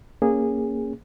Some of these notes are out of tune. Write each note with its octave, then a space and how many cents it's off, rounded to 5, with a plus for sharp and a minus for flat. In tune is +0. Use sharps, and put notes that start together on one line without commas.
A#3 +0 C#4 +0 G#4 -15